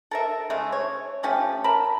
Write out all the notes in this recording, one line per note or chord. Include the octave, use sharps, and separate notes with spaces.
A4 A#4 E5
C#3 G#3 A3
C#5
F3 A3 C#4 G4
A#4 A5 B5